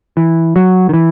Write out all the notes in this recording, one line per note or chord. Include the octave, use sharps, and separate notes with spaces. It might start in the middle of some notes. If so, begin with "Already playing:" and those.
E3
F#3
D#3
E3